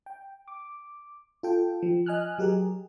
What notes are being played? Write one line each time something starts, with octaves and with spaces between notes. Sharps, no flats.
G5
D6
F4 A4 G5
F3
D#5 G#5 F6 F#6
F#3 G4 G#4 A#4